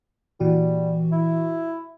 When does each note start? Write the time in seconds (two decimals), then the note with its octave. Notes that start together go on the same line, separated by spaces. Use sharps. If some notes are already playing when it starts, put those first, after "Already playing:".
0.40 A#2 E3 G3 F#4
1.12 E4